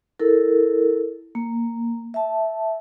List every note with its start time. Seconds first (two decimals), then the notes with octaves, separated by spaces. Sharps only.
0.19 E4 A4 A#4
1.35 A#3
2.14 E5 A5